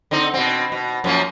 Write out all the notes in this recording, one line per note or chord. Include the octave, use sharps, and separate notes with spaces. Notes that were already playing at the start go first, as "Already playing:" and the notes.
D3 C4 D#4
B2 C4
B2
F#2 F3 A#3